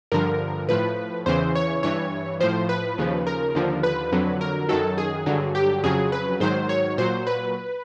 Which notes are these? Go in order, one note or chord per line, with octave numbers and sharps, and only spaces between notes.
G2 D3 F3 A#4
A2 F3 B4
E2 C#3 E3 C5
C#5
G2 E3 C#5
A2 F3 C5
B4
D#2 C#3 F3
A#4
D#2 D3 F3
B4
F2 D3 F#3
A#4
F#2 D#3 F#3 A4
G#4
G2 D3 F#3
G4
F2 C#3 F#3 G#4
B4
G#2 D#3 F#3 C5
C#5
A#2 F#3 C5
B4